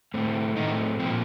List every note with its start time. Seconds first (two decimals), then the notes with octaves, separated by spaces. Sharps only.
0.14 A2 A3 C4
0.56 A2 D#3 A3 C4 D#4
1.00 A#2 F3 A#3 C4